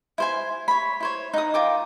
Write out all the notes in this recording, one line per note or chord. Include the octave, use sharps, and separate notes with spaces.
E4 C5 G#5
C#5 B5
E4 C5 C#5
D#4 F#5 G5 D#6
F4 A#4 G5 D6